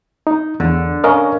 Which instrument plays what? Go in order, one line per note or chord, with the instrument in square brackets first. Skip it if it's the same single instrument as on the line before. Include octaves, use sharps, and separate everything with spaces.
[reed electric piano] D#4
[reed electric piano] E2 [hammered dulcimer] D3
[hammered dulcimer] C#4 [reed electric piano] A#4 D#5 F5